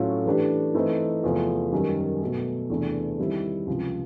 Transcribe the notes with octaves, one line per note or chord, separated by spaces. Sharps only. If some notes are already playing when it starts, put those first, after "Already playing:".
Already playing: A2 F#3 A3 C#4 F4
E3 A3 D4 G4
E3 A3 C4 D#4
E2 C3 F3 A3
F#2 D#3 G3
B2 F#3 A3
E2 C3 E3 A3 D4
D#3 G3 C4 E4
C#2 C3 F3